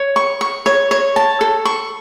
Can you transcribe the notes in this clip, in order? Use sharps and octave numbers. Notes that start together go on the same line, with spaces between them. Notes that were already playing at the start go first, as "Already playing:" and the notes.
Already playing: C#5
C#6
C#6
C#5
C#5
A5
A4
C#6